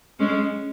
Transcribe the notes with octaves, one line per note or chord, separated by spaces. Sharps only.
G#3 C#4